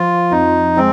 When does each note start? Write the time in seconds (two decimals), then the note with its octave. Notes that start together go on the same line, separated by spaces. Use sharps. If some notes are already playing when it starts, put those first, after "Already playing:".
Already playing: F3 F4
0.31 F2 D#4
0.77 G#3 C4